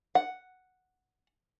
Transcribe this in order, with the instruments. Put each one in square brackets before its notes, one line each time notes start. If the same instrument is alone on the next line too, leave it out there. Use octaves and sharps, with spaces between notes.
[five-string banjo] F#5